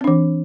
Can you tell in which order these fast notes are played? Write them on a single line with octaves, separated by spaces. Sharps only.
C4 D4 E3